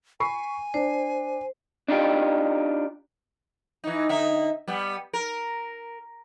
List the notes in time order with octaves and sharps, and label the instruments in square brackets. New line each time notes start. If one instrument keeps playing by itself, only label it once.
[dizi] G#5 [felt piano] B5 C#6 C7
[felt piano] D4 [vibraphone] C5
[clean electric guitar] D4 D#4 F4 G4
[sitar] E3 D#4
D3 D#4 E5
G3 B3
A#4